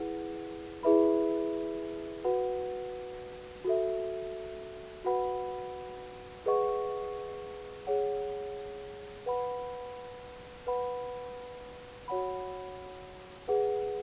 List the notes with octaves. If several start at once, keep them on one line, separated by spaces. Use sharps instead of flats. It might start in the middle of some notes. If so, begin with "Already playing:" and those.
Already playing: E4 G#4 B4 F#5
E4 G#4 B4 E5 B5
F#4 B4 F#5
F#4 A4 E5
F#4 B4 F#5 B5
G#4 B4 D#5 F#5 C#6
G#4 C#5 F#5
B4 F#5 B5
B4 F#5 B5
F#4 C#5 F#5 B5
G#4 B4 F#5